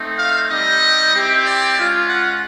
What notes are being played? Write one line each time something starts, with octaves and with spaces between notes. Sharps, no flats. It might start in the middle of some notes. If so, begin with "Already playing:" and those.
Already playing: A3 C4 D#4
F5
G3 C4 D#4 G4 D#5
C4 E4 G4
D5
G#3 C#4 F4
F#5